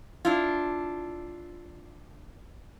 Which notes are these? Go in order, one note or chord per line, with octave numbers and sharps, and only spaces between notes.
D4 E4 F4